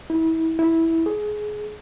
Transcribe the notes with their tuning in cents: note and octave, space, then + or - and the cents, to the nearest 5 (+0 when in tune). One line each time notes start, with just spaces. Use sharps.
E4 -30
E4 -10
G#4 +20